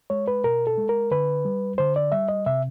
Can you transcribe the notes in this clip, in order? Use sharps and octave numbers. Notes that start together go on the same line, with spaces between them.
G#3 C#5
B4
B2 A#4
A4
G#3
A#4
D3 B4
G3
D3 C5
D5
G3 E5
D#5
C3 E5